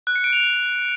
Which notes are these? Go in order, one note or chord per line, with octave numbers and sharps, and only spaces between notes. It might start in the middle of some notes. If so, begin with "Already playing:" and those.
F#6
C#7
D7
F7